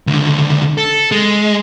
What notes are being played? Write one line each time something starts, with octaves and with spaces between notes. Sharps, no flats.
C#2 D3
A4
G#3